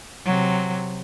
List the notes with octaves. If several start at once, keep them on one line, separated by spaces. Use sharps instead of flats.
C3 F#3